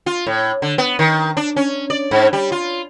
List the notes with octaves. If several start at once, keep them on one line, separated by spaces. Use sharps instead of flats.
F4
A2
D3
B3
D#3
D4
C#4
D5
G#2
G3
F4